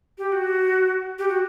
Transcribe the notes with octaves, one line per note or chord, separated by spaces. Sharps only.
G4
G4
F#4
G4
F#4